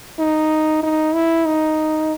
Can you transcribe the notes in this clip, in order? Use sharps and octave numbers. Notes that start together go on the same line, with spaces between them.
D#4
D#4
E4
D#4